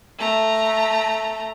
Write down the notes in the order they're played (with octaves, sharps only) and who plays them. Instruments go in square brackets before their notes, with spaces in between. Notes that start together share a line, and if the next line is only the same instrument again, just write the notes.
[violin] A3 A#5